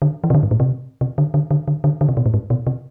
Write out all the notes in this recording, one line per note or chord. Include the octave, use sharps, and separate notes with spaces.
D3
E3
C3
D3
G#2
A2
C3
C3
D3
D3
D3
D3
D3
D3
C3
B2
A2
G#2
B2
C3